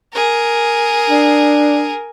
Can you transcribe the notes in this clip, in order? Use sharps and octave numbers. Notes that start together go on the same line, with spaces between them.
G#4 A#4
D4